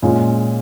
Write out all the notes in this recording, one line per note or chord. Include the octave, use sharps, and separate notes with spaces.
A#2 G#3 C#4